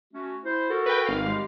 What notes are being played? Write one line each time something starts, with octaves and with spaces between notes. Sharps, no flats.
A3 C#4 F#4
E4 C5
F#4 A4 A#4
B4 G5
G#1 F5
G3 G#3 G4